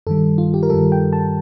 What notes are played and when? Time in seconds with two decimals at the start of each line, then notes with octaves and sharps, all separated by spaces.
0.07 G2 D#3 G3 A4
0.38 F4
0.54 G4
0.63 A#4
0.70 G2 D#3 G3 A4
0.92 G5
1.13 A5